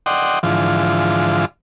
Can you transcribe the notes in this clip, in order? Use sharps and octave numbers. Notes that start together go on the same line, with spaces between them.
D5 D#5 F#5 G5 C6
G#2 D3 E3 F3 F4